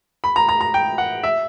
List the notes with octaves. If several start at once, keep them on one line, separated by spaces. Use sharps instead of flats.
B5
A#5
A#5
A#5
G5
F#5
E5